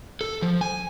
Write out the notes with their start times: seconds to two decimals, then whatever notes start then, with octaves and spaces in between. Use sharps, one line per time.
0.21 A4
0.42 F3
0.61 G#5